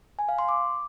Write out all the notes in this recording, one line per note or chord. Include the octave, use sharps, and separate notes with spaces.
G#5
F5
C6
D6